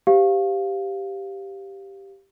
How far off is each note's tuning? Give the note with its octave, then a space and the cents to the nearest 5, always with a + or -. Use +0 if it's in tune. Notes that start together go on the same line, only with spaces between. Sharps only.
G4 +0 C5 -25 F5 +0